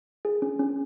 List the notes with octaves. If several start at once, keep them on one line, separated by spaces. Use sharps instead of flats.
G#4
C#4
C#4